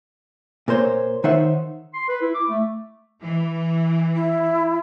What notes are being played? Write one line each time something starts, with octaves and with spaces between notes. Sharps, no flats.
A#2 A#4 C5 C#5
D#3 D#4 C5 C#5 E5 F#5
C6
B4
E4
D6
A3
E3
E4